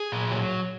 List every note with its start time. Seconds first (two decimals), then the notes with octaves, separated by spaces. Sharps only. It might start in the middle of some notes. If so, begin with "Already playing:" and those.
Already playing: G#4
0.12 A#2
0.31 F#3